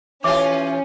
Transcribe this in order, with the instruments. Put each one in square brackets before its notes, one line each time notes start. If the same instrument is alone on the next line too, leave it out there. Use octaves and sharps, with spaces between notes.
[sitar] E3 F4 G4 [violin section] C#4 [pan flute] C#5 [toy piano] E5 D6